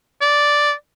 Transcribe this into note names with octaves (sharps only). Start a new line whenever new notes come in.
D5